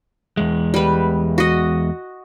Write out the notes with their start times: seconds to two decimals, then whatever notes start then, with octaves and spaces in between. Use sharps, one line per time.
0.37 E2 G#3
0.74 G3 B4
1.38 F#4 D#5